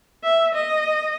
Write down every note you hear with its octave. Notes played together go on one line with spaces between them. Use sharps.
E5
D#5